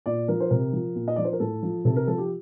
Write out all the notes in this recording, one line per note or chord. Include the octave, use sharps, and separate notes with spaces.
A#2 D5
F3 A#4
C5
C3 A#4
F3
A#2
D#5
F3 D5
C5
A#4
A2 A4
F3
C3 A4
A#4
F3 A4
G4